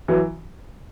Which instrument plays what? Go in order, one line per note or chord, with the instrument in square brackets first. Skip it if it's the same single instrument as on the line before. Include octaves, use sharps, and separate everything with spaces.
[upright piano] E3 F#3